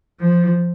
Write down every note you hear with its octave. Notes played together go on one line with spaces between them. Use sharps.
F3